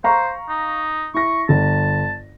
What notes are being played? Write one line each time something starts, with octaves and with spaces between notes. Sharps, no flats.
C5 F5 A#5 C#6
D#4
E4 C#6 A#6
G1 A5